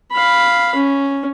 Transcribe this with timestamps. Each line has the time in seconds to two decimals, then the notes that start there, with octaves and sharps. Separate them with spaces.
0.12 F5 B5
0.75 C#4